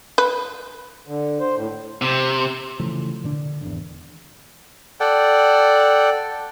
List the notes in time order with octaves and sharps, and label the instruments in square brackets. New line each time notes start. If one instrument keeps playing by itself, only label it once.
[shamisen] B4
[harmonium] D3
C5
A2
[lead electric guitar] C3
[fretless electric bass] C#3 E3 F3 A3
A#2 D3 D4
G#1 E2
[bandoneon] A4 D5 F#5 G5